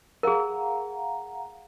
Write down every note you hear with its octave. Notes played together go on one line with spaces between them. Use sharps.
G#4 A#4 F5 F#5 A#5